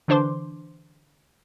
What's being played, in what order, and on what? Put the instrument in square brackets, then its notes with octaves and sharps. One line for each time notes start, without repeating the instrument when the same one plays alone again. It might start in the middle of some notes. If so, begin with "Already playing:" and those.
[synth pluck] D3 E3 D4 C5 C6 D6